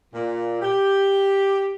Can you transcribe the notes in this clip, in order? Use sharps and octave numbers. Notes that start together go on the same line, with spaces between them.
A#2
G4